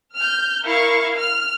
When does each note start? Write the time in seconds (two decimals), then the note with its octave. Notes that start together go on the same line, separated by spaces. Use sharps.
0.17 F6 G6
0.66 E4 A#4 F5 C#6
1.17 F6